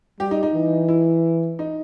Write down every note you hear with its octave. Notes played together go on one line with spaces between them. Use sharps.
G3 G4
D#4
D#4
E3
E4
D#4